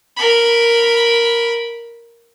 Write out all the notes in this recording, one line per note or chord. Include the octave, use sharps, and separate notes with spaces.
A#4 B5